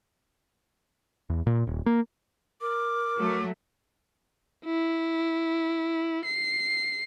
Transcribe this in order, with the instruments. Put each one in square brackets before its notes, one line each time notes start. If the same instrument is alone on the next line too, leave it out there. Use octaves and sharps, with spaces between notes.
[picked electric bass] E2
A#2
D#1
A#3
[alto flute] A#4 [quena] D6
[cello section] F#3 A3
[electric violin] E4
C7